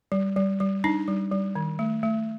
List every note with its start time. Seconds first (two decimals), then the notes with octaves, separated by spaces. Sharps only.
0.12 G3
0.36 G3
0.60 G3
0.84 D4 D#4
1.08 G3
1.32 G3
1.55 D#3
1.79 A3
2.03 A3